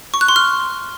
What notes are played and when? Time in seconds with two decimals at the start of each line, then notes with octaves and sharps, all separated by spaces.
0.14 C#6
0.21 F#6
0.28 C6
0.36 F6